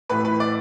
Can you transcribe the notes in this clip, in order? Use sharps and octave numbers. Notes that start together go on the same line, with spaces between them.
A1 A2 E3 B4
B4
D5